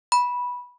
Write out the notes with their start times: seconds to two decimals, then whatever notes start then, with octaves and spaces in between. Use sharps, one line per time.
0.12 B5